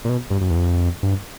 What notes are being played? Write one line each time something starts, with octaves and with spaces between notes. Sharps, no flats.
A#2
B2
G2
F#2
E2
F2
G2